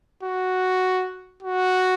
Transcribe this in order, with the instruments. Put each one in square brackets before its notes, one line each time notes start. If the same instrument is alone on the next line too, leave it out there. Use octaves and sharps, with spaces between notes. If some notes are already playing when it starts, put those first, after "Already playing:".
[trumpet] F#4
F#4